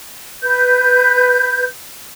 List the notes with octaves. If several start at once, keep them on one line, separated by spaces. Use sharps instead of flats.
B4 G6